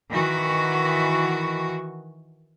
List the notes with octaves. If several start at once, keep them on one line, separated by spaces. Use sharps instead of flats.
D#3 E3 F#4